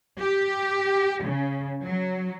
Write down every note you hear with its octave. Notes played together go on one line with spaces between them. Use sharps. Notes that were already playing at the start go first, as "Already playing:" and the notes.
G4
C#3
F#3